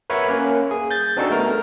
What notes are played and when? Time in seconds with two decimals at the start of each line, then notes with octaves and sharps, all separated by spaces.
0.10 A#4 B4 C#5 E5 F#5
0.29 A#3 C#4
0.71 G#4
0.91 G6 A6
1.17 C4 D4 D#4 F#4 G#4 A4
1.31 A3 B3 A#4